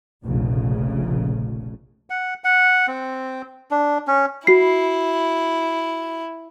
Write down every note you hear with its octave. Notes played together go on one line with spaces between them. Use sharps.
F1 A#1 C#3
F#5
F#5
C4
D4
C#4
E4 F#4 C7